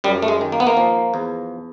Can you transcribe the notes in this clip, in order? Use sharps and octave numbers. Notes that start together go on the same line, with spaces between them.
F#2 G3
A3
G#3
D#3
A#3
B3
A#3
F3
E2